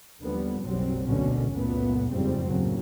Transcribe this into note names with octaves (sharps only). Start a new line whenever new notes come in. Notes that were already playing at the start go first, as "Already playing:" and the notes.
D#2 D3 F3 G3 B3
F#1 B1 F#3 G3 C4
G#1 D2 B2 D3 C#4
C#2 F#2 A#2 A3 B3
F#1 F2 G#2 C#3 G3 C4
D#2 A2 C#3 F#3